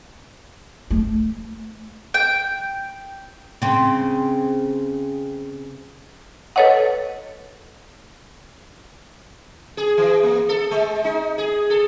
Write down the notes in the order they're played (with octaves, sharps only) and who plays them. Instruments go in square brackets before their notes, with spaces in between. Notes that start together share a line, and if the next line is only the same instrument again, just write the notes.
[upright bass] A3
[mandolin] G5
[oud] C#3 C4
[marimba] A4 B4 C#5 D#5 F#5
[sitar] G#4
E3
A#3
A4
G#3
D#4
G#4
A4